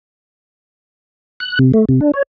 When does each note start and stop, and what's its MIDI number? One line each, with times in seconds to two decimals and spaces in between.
1.40 1.59 90
1.59 1.72 48
1.74 1.85 57
1.89 2.00 48
2.01 2.11 62
2.14 2.23 73